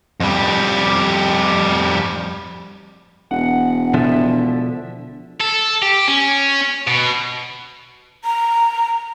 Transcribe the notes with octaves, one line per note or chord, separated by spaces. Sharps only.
F2 G3
E1 F#5
B2 D3 F3 E5
A4
G4
C#4
B2
A#5